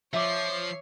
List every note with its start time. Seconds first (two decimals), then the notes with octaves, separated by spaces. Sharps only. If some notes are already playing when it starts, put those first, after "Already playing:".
0.13 F3 C#5 E5 D6 C7